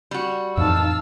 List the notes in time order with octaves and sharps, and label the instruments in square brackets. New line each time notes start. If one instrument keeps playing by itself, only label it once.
[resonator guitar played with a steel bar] G3 F#4
[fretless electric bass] F2 A2 E3 [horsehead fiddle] D#4 A5 [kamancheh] F5 E6